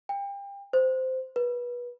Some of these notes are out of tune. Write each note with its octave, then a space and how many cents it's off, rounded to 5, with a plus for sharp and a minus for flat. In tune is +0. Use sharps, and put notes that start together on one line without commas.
G5 +30
C5 -10
B4 -25